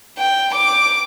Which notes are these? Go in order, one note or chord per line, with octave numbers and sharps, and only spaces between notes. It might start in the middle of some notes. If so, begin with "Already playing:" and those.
G5
D6